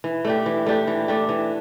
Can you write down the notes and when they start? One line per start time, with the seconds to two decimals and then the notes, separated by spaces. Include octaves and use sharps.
0.04 E3
0.25 A3 D4 G4
0.46 E3
0.66 A3 D4 G4
0.87 E3
1.08 A3 D4 G4
1.29 E3